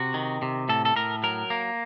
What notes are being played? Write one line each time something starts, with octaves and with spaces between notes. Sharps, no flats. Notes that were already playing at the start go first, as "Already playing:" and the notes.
Already playing: C3 F#4
D#3
C3
A2 A4
A4
A2 A#4
F#3 A#4
A#3